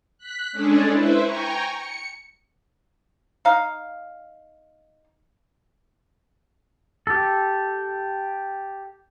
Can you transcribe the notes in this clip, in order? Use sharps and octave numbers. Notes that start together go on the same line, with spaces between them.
F#6 B6
G#3 C#4 D4 G#4 A4
E4 B4 C5 E5
G5 G#5 A#5 C#6
C#7
D#4 F5
G4 A4